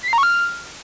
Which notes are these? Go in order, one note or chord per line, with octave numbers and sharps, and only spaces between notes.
B6
C7
A#5
C#6
F6